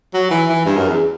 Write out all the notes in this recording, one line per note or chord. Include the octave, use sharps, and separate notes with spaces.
F#3
E3
E3
G2
F#2
E2